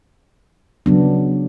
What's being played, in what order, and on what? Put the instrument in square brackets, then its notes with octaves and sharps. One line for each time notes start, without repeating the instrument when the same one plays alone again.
[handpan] C#3 F#3 B3 D4